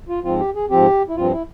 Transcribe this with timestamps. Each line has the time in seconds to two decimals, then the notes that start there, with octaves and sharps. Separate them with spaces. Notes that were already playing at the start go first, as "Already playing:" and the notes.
0.09 F4
0.24 G#2 F3 C4 F4
0.40 G4
0.55 G#4
0.70 G#2 F3 C4 G4
1.09 E4
1.16 G2 F3 C4 F4
1.32 E4